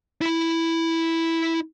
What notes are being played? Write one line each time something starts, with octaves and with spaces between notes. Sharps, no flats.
E4 B5